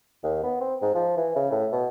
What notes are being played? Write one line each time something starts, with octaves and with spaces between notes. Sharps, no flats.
D#2
B3
C4
G#2
F3
E3
C#3
A2
B2